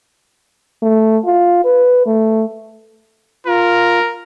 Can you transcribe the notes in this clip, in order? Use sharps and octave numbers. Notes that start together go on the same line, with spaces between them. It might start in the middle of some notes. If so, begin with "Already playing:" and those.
A3
F4
B4
A3
F4 A#4